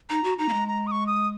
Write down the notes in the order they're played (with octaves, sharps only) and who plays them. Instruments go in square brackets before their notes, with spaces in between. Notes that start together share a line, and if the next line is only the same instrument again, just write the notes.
[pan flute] D#4 [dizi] A#5
[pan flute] F#4
[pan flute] D#4 [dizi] A#5
[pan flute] A#3
G#3
[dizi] A#5
D#6
C#6
D#6